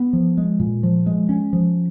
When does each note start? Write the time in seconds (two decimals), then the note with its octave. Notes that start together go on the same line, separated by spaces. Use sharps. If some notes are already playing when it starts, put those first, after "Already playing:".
Already playing: B3
0.13 F3
0.38 G#3
0.60 A#2
0.83 F3
1.06 G#3
1.29 C#4
1.53 F3